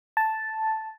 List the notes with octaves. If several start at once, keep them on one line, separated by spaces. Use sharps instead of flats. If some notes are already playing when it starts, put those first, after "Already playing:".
A5